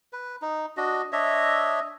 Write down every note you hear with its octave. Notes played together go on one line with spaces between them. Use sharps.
B4
D#4
D4 F#4 D#5
D4 C#5 D#5 E5